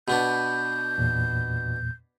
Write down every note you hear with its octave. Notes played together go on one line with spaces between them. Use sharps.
B2 B3 D4 G6
E2 A#2